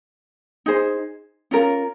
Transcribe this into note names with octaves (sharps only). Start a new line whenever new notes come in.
D#4 G#4 C5
C#4 F4 A#4